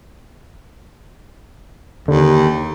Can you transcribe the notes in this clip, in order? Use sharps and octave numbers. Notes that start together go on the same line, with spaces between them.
D#2 D3